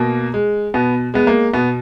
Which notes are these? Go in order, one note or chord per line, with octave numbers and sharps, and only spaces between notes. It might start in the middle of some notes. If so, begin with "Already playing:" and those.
Already playing: B2 A#3
G#3
B2 B3
G#3 B3
A#3
B2 B3